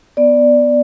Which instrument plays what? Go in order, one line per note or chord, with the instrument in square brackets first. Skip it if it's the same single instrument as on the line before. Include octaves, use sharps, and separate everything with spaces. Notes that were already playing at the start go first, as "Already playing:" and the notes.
[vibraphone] B3 D5